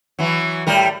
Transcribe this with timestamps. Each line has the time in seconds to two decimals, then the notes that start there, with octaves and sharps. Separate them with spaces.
0.19 E3 F#3
0.67 A2 G3 A#4